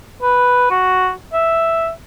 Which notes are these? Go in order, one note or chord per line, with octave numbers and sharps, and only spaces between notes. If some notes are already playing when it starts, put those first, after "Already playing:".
B4
F#4
E5